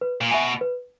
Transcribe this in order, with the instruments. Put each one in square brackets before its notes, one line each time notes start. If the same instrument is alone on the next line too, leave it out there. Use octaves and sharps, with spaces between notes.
[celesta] B4
[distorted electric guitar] A#2
[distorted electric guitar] B2 [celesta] E5 G#5
[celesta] B4